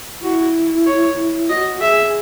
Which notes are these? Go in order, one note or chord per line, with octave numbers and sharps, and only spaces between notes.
E4 F#4
C#5
E4
F#4 D#5
G#4 E5